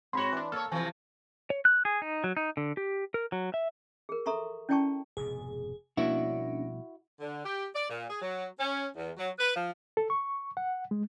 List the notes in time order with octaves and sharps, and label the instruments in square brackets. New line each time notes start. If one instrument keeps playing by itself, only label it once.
[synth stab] G#2 C#5 [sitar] C4 F#4 [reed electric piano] B5 C6
[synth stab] E3 D4
[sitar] A#3 C#5 [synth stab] A4 [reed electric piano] F6
[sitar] C3 E3 F3 [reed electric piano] G#5
[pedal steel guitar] C#5
F#6
G#4
D#4
F#3
D#4
D3
G4
A#4
F#3
E5
[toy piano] G#4 A#4
A4 E5 A#5 C6 C#6
C#4 E4 D5 G5 A5 C#6
[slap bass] F1 G#2 B2 [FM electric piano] G#4
[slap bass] B2 F3 G3 [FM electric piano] A#3 C#4 D4 [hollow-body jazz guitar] E4 F#4
[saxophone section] D3
G4
D5
A#2
G#4
F#3
C#4
E2
F#3
B4
F3
[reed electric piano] A4
C#6
F#5
G#3